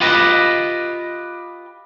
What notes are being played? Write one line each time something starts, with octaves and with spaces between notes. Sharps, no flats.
F4 G4 B4 D#5